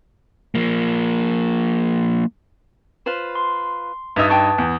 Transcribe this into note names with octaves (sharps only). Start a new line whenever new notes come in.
F3 A#3
F4 B4 C5
C6
G2 D#4 B4 E5 F5 D#6 G#6 A6
G5 A5 C#6
E2